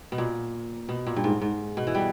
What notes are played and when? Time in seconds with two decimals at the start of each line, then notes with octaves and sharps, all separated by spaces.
0.12 B2
0.18 A#2
0.89 B2
1.07 A#2
1.16 G2
1.24 G#2
1.41 G#2
1.77 B2
1.87 E3
1.94 G3